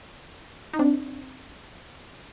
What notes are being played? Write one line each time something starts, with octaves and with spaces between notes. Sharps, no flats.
D#4
C4 D4